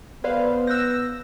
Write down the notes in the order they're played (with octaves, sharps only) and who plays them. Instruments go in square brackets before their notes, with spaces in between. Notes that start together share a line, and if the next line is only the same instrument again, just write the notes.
[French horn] B3 [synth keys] B4 C5 F5 [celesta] D5
[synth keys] E6 A#6 [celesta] F#6 G6